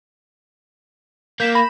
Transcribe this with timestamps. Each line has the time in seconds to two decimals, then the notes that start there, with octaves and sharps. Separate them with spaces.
1.40 A#3 G6 B6 E7
1.55 B5 A#6